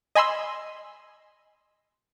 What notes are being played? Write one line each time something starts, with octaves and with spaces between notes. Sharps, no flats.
D#5 G#5 B5 C6 E6